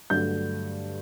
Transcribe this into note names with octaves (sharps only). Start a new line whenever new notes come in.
G2 D3 F#3 A3 G6